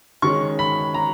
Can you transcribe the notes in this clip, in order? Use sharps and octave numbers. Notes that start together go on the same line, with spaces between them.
D#3 G#3 C#4 C#6
B5
A#5